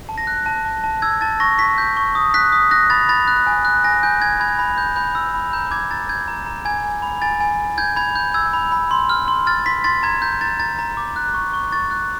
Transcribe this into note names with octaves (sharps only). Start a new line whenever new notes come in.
A5
A#6
F#6
A5
A5
A5
E6 G#6
A5 A6
C#6 A#6
C#6 B6
G6
C#6
D#6
F#6 B6
D#6
F#6 A#6
B5 A6
B5 A6
F#6
G#5
F#6
G#5 A#6
G#5 G6
G#5 G#6
B5 G#6
B5
G6
B5 G6
E6
B5
A#5 G6
D6 G#6
A#5 A6
G6 G#6
A#5
A#5
G#5 G#6
G#5
B5
G#5 A6
G#5
G#5
G6 G#6
B5 G#6
G6
E6 G#6
B5
B5
C6
F6
C6
F6 A6
C6 B6
C6 A6
A#5 G#6
A#5 G6
A#5 A6
A#5 A6
A#5
D6
F#6
C#6
C#6
C#6 A6
F#6